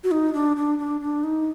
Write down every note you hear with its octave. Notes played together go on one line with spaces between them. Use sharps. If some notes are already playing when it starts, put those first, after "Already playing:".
F#4
D#4
D4
D4
D4
D4
D#4